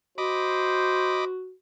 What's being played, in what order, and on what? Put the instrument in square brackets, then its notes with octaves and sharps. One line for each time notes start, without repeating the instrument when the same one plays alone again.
[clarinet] F#4 [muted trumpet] C5 [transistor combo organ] D#5 B5 D6